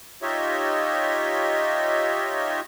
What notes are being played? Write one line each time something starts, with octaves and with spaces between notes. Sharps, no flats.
D#4 F4 G4 C#5 D#5 E5